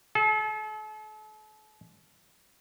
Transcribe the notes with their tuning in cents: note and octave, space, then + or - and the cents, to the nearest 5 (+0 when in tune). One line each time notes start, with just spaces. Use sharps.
A4 -40